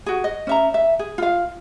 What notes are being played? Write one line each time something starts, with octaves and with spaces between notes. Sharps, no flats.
F#4 G#4
D#5
C#4 E5 A#5
E5
G#4
F4 F5